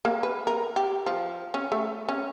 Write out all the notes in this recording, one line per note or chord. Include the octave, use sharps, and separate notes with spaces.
A#3
B4
A#4
G4
F3
C#4
A3
C#4